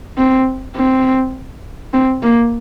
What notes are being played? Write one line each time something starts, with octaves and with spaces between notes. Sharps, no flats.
C4
C4
C4
A#3